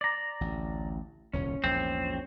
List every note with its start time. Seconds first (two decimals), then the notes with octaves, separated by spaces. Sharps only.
0.01 D5 A#5
0.41 A1 D2
1.33 D#1 C2 F2 C#4
1.64 A#1 E2 G#2 C4